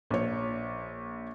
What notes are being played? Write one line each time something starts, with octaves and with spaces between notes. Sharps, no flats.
A#1 C#5